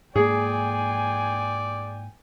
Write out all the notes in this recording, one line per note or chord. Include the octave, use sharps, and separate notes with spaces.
G#2 A#3 G#4 D5 G5 G#5